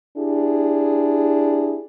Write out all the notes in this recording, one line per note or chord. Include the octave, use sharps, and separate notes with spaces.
D4 E4 G4 G#4